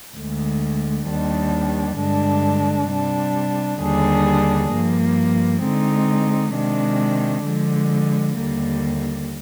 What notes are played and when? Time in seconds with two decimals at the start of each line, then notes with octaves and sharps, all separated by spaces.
0.16 D2 D3 G#3
1.08 D#2 D#3 G3 D4
1.99 G2 D3 G#3 D4
2.89 C3 G3 D4
3.80 D#2 D3 G3 D4 G#4
4.71 G2 F3 A#3
5.63 D3 G#3 C4 D#4
6.54 C3 D#3 G#3 D4
7.45 D3 F3 G#3
8.36 D#2 D3 G3 A#3